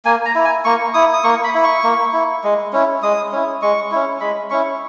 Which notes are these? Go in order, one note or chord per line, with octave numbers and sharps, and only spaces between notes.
A#3 G#5
A#5
E4
G#5
A#3 C#6
E4 D#6
D#6
A#3 C#6
B5
E4
C#6
A#3
E4
G#3
C#4 E4
G#3 D#6
C#4 E4
G#3 C#6
C#4 E4
G#3 B5
C#4 E4 C#6